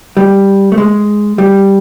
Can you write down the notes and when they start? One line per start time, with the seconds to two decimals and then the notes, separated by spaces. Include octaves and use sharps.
0.17 G3
0.72 A3
0.78 G#3
1.38 G3